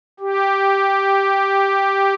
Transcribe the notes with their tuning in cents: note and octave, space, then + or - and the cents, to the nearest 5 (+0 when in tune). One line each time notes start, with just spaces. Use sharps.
G4 +0